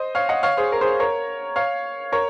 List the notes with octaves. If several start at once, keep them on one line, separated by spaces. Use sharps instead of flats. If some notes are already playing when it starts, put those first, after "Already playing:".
Already playing: C5 D#5
C#5 F5
D#5 F#5
C#5 F5
G#4 C5
A#4
G#4 C5
A#4 C#5
C#5 F5
A#4 C#5